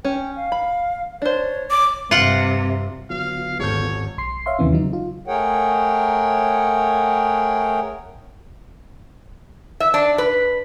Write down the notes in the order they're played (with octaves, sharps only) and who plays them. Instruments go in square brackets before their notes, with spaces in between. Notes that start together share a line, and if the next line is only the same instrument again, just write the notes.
[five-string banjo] C#4 [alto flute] G5
[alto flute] F5
[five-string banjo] B5
[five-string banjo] D4 C5 [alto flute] C#5
[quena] D6
[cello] G2 C3 [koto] F4 F#5
[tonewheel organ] D3 B3 F4 [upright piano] F#3 [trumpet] F5
[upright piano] D#1 A4 G6 [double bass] G#1 [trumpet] C#5
[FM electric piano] B1 C6 C7
C#5 E5 F5 C6
D#2 C3 D#3 E3 B3 C#4
C#3 F#3 D#4
F4
[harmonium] A3 G#4 A#4 C#5 F#5 G5
[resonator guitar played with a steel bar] E5
D4
B4